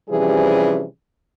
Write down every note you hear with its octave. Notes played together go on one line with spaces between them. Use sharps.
C3 E3 F3 G3 C#4 G#4